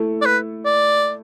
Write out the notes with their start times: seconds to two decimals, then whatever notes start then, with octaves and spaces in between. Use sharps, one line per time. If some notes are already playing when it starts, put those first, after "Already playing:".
Already playing: A3 E4 A4
0.22 D5
0.26 B4
0.65 D5